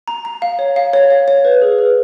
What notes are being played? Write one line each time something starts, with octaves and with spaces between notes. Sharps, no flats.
A#5
A#5
F5
C#5
F5
C#5
F5
C#5
B4
G#4
B4